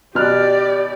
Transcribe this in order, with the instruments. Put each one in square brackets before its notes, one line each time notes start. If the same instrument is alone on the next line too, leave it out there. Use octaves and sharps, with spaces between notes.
[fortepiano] B2 F6 F#6 [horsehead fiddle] G4 D5